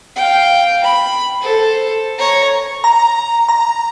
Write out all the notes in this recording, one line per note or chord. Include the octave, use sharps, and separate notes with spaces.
F5 G5
B5
A4 C5
C#5 A#5
A#5
A#5